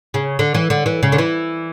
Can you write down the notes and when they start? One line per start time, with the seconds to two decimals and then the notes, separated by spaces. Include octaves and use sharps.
0.14 C#3
0.39 D3
0.54 E3
0.70 D3
0.86 E3
1.03 C#3
1.12 D3
1.18 E3